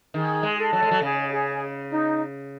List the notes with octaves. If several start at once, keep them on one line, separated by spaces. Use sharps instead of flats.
D#3 G#4
G#3
A4
F#3
G#3
F#3
C#3 G#4
G#4
D#4